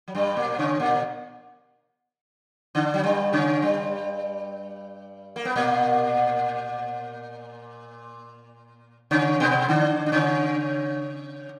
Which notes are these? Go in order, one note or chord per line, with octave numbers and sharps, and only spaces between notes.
F#3
G2 G3
A#2 A#3
C#3 C#4
A#2 A#3
D3 D4
F#3
G2 G3
C#3 C#4
G2 G3
A#3
B3
A#2 A#3
C#3 C#4
B2 B3
D3 D4
D4
C#3 C#4